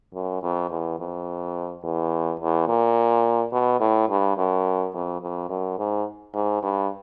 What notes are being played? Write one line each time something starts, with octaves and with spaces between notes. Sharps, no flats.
F#2
F2
E2
F2
E2
E2
A#2
B2
A2
G2
F#2
F2
F2
F#2
G#2
G#2
G2